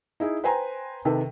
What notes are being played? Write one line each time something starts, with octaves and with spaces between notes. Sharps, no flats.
D#4 E4 G#4
B4 C5 G5 G#5 A#5 C6
C3 D#3 A4 B4